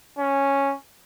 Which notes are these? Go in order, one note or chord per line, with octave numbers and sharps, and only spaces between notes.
C#4